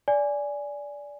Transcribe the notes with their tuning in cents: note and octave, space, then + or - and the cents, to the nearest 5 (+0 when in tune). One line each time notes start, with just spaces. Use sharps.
D5 -15 G#5 +0